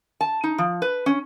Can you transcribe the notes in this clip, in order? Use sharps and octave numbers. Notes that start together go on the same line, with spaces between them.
A5
D#4
F3
B4
C#4